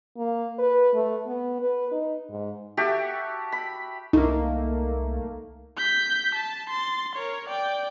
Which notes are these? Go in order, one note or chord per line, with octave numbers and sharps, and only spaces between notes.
A#3
B4
A3
B3
B4
D#4
G#2
F#4 G4 A4 E5
B5
C2 A3 A#3 D#4
G6 B6
A5
C6 A6
A#4 C#5
D5 G5